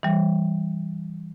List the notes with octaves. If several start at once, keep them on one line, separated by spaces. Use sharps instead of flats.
E3 G3